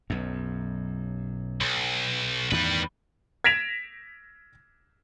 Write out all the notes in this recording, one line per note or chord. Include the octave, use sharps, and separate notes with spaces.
B1 F#2
B1
E2 A2 D#3 G3 B4
G#6 A#6 B6 D7 E7 F7